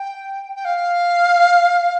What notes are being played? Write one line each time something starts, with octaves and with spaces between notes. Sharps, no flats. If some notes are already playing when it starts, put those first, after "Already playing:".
Already playing: G5
G5
F5